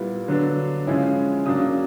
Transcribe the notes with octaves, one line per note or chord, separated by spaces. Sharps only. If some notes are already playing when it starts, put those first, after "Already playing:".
Already playing: A#2 G3 B3 E4
D3 F#3 B3 D4
C#3 F3 G#3 C#4 E4
C#3 F#3 A#3 D4 D#6